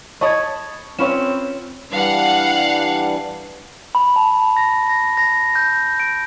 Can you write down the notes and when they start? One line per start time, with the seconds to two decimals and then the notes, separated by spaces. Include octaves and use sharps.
0.21 C#5 D#5 A5 B5 C#6 D#6 G#6
0.99 C4 C#4 F4 B4 C#5 E7
1.92 E3 G3 D4 F5 F#5
3.95 B5
4.16 A5
4.57 A#6
4.90 A#6
5.17 A#6
5.55 G6
6.00 D7